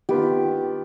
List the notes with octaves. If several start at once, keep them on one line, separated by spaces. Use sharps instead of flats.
D#3 B3 F4 G4